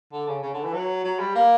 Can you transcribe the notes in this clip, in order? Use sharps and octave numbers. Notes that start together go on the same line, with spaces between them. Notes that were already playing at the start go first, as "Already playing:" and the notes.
D3
C#3
C#3
D3
E3
F#3
F#3
G3
A#3